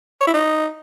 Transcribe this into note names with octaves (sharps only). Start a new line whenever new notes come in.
C#5
E4
D#4